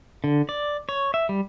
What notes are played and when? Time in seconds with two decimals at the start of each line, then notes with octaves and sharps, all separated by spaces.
0.24 D3
0.49 D5
0.89 C#5
1.14 E5
1.29 G3